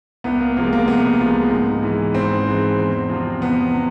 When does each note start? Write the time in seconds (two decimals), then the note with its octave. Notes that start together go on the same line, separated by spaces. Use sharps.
0.24 C2 B3
0.40 A#3
0.57 C3 F3 G#3 A#3
0.73 A#3
0.88 C2 B3
1.20 C3 F3 G#3
1.51 G#2
1.83 E3 G#3
2.14 G#2 C4
2.47 E3 G#3
2.79 E2
3.10 C3 F3
3.41 E2 B3
3.74 C3